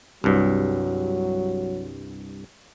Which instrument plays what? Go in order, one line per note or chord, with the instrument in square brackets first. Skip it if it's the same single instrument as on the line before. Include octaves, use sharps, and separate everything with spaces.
[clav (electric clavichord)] C2 G2 [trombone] F#3